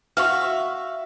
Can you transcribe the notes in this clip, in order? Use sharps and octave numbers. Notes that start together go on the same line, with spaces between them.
F#4 E5 F5 C#6 F6